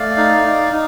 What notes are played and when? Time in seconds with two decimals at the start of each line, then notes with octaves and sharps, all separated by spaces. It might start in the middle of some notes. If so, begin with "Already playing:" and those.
Already playing: A3 D5 F5
0.17 D#4
0.46 D#4
0.72 D#4